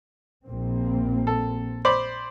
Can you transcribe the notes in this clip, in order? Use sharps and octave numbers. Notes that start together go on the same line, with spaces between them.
A#1 A#3 C4
A4
C5 D5 B5